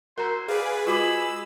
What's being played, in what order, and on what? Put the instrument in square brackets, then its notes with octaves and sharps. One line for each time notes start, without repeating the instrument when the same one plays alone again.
[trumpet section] E4 C5 [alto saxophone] F#4 [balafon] A#4 A#5
[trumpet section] C#4 D5 [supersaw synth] G#4 B4 [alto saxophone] F5
[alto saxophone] G#3 [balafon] F4 F#4 D6 [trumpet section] G#4 C5 B5 [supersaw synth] E6